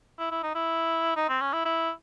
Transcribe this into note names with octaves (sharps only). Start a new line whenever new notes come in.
E4
E4
D#4
E4
D#4
C4
C#4
E4
E4